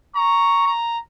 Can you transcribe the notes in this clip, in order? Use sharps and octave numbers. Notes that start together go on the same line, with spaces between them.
A#5 C#6
A#5